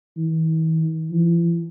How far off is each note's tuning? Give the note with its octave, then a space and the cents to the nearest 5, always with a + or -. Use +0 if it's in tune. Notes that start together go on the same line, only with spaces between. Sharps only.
E3 -45
E3 +45